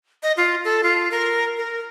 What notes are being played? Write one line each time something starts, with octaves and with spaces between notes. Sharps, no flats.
D#5
F4
A4
F4
A#4
A#4